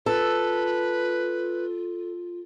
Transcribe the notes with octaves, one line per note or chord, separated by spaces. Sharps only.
F4 A4 B4